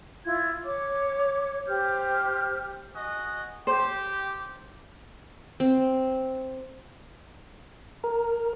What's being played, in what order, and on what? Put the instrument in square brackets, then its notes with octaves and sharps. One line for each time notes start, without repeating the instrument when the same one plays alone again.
[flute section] E4 F4 G#6
C#5 D6
G4 C5 F6 G6
[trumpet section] F#4 G#4 D#5
[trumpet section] G4 [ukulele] C5
[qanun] C4
[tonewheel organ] A#4